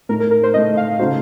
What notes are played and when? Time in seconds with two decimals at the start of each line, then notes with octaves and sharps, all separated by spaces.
0.09 A2 A3 D#4 A#4
0.20 A#4
0.31 A#4
0.43 C5
0.53 A2 A3 D#4 D#5
0.77 F5
0.99 C#3 A3 D#4 F#4 C5